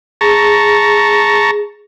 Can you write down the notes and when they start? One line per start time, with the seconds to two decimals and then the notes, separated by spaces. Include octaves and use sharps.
0.21 G#4 A5 A#5 C#6